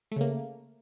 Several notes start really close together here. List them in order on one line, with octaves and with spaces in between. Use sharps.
A3 C#3 A#3